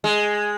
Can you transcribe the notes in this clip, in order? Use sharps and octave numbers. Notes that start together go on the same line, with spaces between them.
G#3